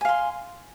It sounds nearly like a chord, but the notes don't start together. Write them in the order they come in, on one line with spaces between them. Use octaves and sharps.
G#5 F5 C6